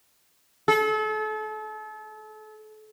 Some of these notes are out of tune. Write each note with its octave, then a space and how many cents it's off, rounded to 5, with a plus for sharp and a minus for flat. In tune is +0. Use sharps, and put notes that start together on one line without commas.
A4 -35